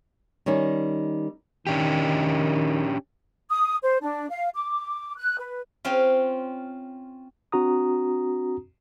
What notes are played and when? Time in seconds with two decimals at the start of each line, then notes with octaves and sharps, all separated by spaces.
0.46 D#3 G3 C#4 D#4
1.67 D#3 C#4 D4 G4
3.50 D#6
3.83 C5
4.02 D4
4.30 F5
4.54 D6
5.17 F#6
5.39 B4
5.85 C4 C#4 F4
7.52 C4 D4 F#4 A#5 D#6